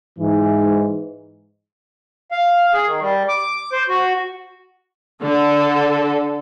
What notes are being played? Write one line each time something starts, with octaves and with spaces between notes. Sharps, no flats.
G#2 E3
F5
G#4
D#3
G3
D6
C5
F#4
D3 A4